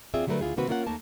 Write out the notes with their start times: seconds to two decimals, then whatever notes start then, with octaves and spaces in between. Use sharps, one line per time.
0.14 D#2 C4 F4 G#4 D5 E5
0.27 D3 F#3 G3 A3 A#4 B4
0.41 D2 E4 F4 G#4
0.56 C3 D#3 A#3 C4 F#4 B4
0.69 A#3 C#4 F4 A#4 D#5 F#5
0.87 D#2 D#3 A3 A#3 A#4 A5